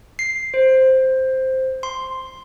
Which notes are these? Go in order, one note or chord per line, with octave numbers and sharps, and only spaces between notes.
C7
C5
C6